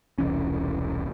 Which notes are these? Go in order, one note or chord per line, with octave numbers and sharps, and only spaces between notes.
E1 C2 E3 C#4